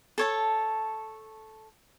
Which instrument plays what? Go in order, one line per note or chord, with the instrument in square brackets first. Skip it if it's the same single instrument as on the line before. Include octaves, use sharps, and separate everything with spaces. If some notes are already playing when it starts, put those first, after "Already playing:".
[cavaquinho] A4 C#5 A5